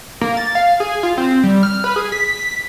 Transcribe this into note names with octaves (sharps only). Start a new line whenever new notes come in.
A#3
A6
F5
G#4
F4
C4
G3
F6
B4
G#4
B6